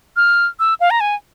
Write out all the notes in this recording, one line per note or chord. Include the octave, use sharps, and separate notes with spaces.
F6
E6
F5
A#5
G#5